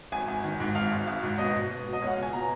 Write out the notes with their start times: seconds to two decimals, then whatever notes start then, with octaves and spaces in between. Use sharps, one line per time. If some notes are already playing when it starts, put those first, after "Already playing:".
0.12 G#1 G#5
0.28 G#1
0.44 D#3
0.60 G#2
0.75 G#1 F5
0.91 G#1
1.07 G#1
1.23 G#2
1.38 B2 D#5
1.54 B2
1.70 B2
1.86 B2
1.93 D#5
2.02 C#2 C#5 F#5
2.12 F5
2.17 B2
2.23 G#5
2.33 B2 A#5